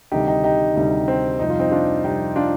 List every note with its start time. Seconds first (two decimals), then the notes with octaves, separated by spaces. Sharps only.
0.11 D2 C3 D#3 G3 D#4 G4
0.28 D#4 G4
0.44 D#4 G4
0.76 D2 C3 D#3 G3
1.08 C4
1.39 F2 C3 G3 D#4
1.50 F4
1.59 C4 D#4
1.71 D4 F4
2.04 F2 C3 G3 D#4 G4
2.36 D4 F4